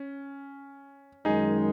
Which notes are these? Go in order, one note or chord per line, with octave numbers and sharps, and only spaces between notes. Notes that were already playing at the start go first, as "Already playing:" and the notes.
Already playing: C#4
F#2 D#3 G#3 D#4 G#4